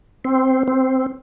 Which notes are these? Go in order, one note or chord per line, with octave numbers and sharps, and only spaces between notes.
C4
C4